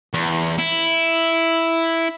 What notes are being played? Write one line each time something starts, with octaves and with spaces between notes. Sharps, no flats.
E2
E4